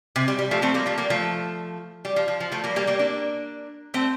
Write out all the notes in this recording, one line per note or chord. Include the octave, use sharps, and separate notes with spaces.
C3
G3
G3
F3 A3
A3 C4
G3 A#3
F3 A3
G3 A#3
F3 A3
G3
F3
F3
F3
F3 A3
G3 A#3
G3 A#3
G3 A#3
A#3 D4
A3 C4